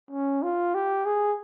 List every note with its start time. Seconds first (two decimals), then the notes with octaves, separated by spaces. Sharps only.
0.11 C#4
0.43 F4
0.74 G4
1.06 G#4